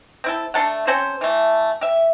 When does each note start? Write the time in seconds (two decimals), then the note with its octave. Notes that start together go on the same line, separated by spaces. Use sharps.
0.24 C4 E4 A4
0.54 A3 D4 A4 F#5
0.87 C4 C#4 A4 C5
1.21 E3 A3
1.81 G4 E5